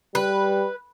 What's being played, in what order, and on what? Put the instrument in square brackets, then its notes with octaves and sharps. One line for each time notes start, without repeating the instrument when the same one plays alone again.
[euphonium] G3 [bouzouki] B4